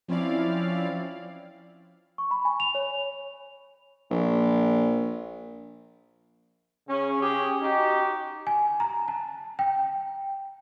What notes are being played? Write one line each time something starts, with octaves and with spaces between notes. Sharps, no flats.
F3 C4 C#4 E4 D5 F5
C#6
B5
G#5
F7
C#5
A#1
C#3 C#4
C#4 G4 G#4
D#4 F#4 G4
G#5
A#5
A5
G5